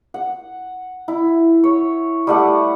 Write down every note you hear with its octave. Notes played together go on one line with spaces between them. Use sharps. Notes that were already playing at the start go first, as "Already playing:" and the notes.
F#5
E4
C#5
G3 A3 F#5